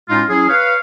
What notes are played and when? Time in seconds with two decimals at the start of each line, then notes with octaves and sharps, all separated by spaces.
0.09 A2 G#3 C#4 D#4 F4
0.29 F#3 C#4 E4 G#4
0.48 B4 C#5 F5